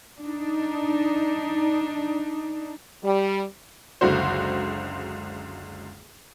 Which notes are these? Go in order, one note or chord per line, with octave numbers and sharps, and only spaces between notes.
D4 D#4
G3
F#1 C#2 D3 F#4 C5